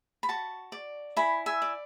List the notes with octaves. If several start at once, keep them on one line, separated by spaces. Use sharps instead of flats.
B5
F#4 A5 C#6
D5
E4 G#5 B5
E5 G#5
D5